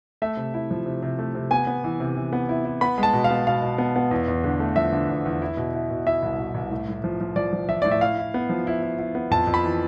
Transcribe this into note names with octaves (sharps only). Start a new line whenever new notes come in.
A3 E5
C3
E4
F3
C3
C3
A3
C3
B3 G#5
B3
E3
C3
E3
B3
E4
E4
B3 B5
G#3
A5
B2
F5
B3
B2 F5
B2
B3
B3
E2
E2
D3
A3
F3 E5
D3
E2
E2
E4
B2
E4
B2
E4 E5
C2
B2
C2
A2
A2
F3
F3
F3 D5
F3
F3 E5
A2 D5
E5
E4 F5
E4
B3
F3
E4
E4
E4
B3
F2 A5
F2
B5
E3